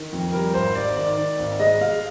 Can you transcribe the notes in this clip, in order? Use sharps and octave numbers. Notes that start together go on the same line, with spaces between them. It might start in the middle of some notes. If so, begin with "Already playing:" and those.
Already playing: D#3
F2
G3 A#4
G#1 C5
G#1 D5
D#3 D5
D#3
G#1
G#3 D#5
G#3 F5